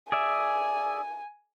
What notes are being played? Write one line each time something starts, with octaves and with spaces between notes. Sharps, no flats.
G#4 D5 E5 G#5